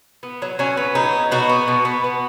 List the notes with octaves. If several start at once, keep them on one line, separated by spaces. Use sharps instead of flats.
B3
F#3
F#3 C#4
B3
F#3 D#4
B3
B2 F#4
B3
B2
B3
B3